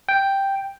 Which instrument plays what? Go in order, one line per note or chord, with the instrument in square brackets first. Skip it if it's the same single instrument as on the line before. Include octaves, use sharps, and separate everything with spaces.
[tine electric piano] G5